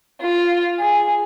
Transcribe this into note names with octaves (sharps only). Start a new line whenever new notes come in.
F4
G#4